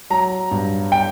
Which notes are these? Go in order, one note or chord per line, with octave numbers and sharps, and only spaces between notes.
F#3 A#5
G2
G5